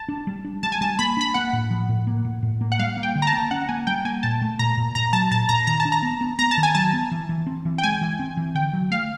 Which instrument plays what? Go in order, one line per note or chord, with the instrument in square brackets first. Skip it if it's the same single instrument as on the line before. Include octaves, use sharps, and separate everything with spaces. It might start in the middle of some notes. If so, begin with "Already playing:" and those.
Already playing: [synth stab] A5
[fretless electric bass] D4
G3
D4
[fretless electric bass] G3 [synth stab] A5
[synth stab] G#5
[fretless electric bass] G3 [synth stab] A5
[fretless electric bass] A#3 [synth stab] B5
[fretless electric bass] D4 [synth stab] B5
[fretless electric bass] A#3 [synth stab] F#5
[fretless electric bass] A2
F3
A2
A#3
A2
A2
A#3
[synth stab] F#5
[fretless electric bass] G3 [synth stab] F5
[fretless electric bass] A#3
[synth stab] G5
[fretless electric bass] D3
[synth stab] A#5
A5
[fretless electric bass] A#3
[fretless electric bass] C#4 [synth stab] F#5
[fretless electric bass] A#3 [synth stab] G#5
[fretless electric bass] G3 [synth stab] G5
[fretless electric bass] A#3 [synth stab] G#5
[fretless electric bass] A#2 [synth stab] A5
[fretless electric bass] A3
[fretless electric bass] A#2 [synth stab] A#5
[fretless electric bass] A#2
[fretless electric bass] A#2 [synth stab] A#5
[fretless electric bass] F#3 [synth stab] A5
[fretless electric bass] A#2 [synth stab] A5
[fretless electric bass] A#2 [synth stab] A#5
[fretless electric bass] D#3 [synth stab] A#5
[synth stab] A5
[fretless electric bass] D4
[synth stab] A#5
[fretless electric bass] B3
B3
[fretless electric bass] B3 [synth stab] A#5
[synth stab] A5
[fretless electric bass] D#3
[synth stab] G#5
[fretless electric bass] F#3 [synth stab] A5
[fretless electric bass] B3
E3
E3
C4
E3
[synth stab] G5
[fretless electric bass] G#3 [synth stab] G#5
[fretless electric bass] E3
C4
E3
[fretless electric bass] D3 [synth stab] G5
[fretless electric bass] F#3
[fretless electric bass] A3 [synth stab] F5